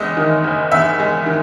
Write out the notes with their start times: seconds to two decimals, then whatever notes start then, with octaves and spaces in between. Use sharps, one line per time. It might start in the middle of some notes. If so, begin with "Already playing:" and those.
Already playing: F#1 E2 G#3 D#5 E5
0.17 D#3
0.44 F#1
0.72 E2 E5
1.00 G#3
1.26 D#3